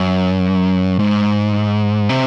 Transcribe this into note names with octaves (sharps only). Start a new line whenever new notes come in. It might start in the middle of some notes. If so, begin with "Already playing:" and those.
Already playing: F#2
G#2
C3